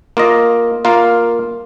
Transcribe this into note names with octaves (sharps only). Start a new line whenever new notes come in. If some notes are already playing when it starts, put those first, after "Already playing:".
A#3 F4 D#5
A#3 F4 A#4 F5